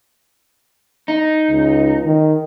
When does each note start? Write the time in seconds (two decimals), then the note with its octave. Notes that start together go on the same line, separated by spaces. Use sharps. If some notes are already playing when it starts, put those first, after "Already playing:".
1.08 D#4
1.50 C#2
2.05 D#3